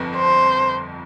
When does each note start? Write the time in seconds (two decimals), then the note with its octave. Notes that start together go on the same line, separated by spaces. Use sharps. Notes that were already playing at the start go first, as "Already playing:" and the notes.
Already playing: G1 F2
0.16 C5